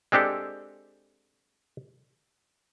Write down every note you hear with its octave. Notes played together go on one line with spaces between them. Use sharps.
G#3 C4 D4 G4 A4